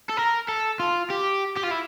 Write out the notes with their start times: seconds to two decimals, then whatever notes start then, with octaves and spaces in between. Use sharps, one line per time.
0.10 A4
0.17 A#4
0.48 A4
0.80 F4
1.10 G4
1.57 G4
1.64 F4
1.72 E4